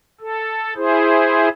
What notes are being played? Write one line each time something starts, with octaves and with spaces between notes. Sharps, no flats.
A4
E4 G#4 C5